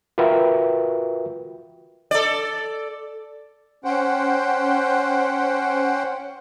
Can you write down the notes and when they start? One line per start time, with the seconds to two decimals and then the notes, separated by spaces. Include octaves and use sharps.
0.18 F4 F#4 A#4 B4 E5 G5
2.11 A4 D5
3.84 C#4 C5 F#5 G5